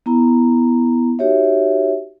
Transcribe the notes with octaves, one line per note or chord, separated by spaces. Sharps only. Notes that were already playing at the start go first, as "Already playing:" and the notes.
B3 E4 A#5
D#4 F#4 G4 C#5 E5